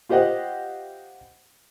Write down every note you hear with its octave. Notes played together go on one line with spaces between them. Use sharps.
F4 G4 C5 D#5 F#5